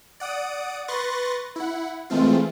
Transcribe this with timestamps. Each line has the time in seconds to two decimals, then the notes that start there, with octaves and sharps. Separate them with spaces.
0.20 D5 F#5 D#6 D7
0.88 B4 C6 C#6 F#6 A6 A#6
1.56 E4 F#5
2.10 E3 G#3 A3 C4 F4